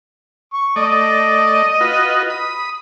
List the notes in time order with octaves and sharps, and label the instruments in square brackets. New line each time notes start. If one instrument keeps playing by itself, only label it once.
[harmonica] C#6
[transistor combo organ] A3 D5 [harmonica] D#5
[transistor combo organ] F4 F#4 B4
B5 D#6